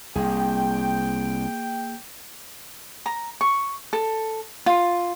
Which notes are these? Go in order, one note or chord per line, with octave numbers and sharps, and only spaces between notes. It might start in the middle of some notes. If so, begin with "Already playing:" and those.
C2 A#3 G#4 G5
A#5
C#6
A4
F4